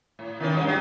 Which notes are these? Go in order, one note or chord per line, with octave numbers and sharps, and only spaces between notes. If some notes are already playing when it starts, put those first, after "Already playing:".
A2
D#3 E3 C#4
G2 G#3 C#4
F#3 G#3 G4